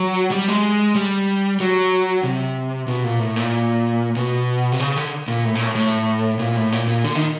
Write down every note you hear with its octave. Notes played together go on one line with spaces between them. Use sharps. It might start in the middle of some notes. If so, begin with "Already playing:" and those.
Already playing: F#3
G3
G#3
G3
F#3
C3
B2
A#2
A2
A#2
B2
C3
C#3
D3
A#2
A2
A#2
A2
A2
A#2
A2
A#2
A#2
D3
D#3